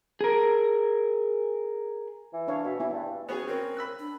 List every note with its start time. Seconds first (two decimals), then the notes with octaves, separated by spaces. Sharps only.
0.21 G#4 A#4
2.33 E3
2.48 D4 C#5 F5
2.64 B2 E5
2.80 E3 B3 E4
2.93 G2
3.29 B3 C#4 F#4 G#4
3.47 C4 C#4 A#4
3.77 B5 E6 F#6
3.99 D4